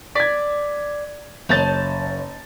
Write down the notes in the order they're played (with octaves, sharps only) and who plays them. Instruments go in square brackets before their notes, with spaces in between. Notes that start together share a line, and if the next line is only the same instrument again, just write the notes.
[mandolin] D5 [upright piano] G#6 B6
[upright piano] F#1 C#5 A6 [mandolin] D#4 A5 G6